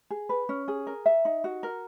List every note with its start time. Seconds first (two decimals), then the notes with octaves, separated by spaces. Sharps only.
0.10 G#4
0.29 B4
0.49 C#4
0.68 G#4
0.87 A#4
1.06 E5
1.25 D#4
1.44 F#4
1.63 A#4